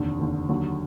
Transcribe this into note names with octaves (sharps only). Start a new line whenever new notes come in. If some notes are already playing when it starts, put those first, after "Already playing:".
Already playing: F1 D#2 D3
F1 D#2 D3
D#2 D3 F#3